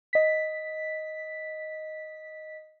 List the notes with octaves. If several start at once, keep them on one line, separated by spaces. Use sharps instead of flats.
D#5 B6